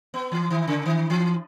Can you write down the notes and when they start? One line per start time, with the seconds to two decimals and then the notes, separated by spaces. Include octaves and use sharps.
0.14 B3
0.32 E3
0.50 D#3
0.68 C#3
0.85 D#3
1.10 E3